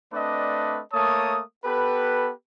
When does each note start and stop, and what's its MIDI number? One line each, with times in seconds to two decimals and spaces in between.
0.13 0.81 57
0.13 0.81 60
0.13 0.81 62
0.13 0.81 71
0.13 0.81 74
0.13 0.81 75
0.93 1.40 57
0.93 1.40 58
0.93 1.40 73
0.93 1.40 81
0.93 1.40 87
1.65 2.31 59
1.65 2.31 67
1.65 2.31 69
1.65 2.31 71